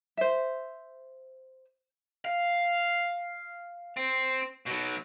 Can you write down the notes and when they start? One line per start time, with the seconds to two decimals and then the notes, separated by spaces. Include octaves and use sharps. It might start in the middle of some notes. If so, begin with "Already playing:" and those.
0.17 C5 E5
2.25 F5
3.97 C4
4.66 B2 F#3